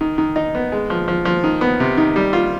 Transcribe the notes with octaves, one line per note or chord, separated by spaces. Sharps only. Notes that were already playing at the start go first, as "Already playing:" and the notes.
D#3
D#3
D#4
B3
G#3
F3
F3
F3
D#3
B3
C3
D#3
G3
F4